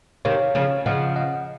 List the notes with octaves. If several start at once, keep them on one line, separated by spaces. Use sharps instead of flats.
C3 D#3 C#5 F5
C#3 F3
C#3 F3 D#5 F#5
D#5 F#5